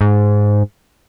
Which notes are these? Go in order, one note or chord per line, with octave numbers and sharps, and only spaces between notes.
G#2